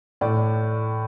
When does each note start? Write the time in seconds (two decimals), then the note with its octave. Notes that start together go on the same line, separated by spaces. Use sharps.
0.21 A2 D5